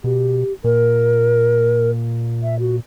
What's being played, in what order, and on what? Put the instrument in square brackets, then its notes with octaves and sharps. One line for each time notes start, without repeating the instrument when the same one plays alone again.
[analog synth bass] B2 [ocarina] G4
[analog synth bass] A#2 [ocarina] A#4
[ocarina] E5
F#4